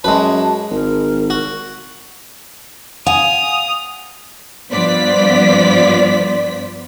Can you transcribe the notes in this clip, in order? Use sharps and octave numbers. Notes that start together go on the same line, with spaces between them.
F#2 G#3 B4 A5
G#1 A#4
F#4
F5 F#5 G#5 D#6 F7
G2 F3 B3 C5 D5 B6